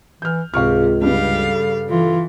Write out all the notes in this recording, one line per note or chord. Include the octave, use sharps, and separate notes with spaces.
E3 F6 G6
C#2 G#2 C3 F4 G#4 F5 C#6 F6
G2 C#3 G3 F5
A4
E3 F4